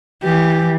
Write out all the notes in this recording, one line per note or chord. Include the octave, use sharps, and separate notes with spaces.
E3 G4